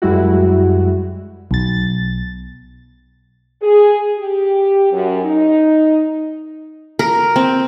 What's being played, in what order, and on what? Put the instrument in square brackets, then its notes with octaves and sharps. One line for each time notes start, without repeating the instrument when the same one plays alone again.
[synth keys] F#2 G3 G#3 E4 F#4
[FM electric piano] B1 A6
[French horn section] G#4
G4
F#2
D#4
[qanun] A#4
C4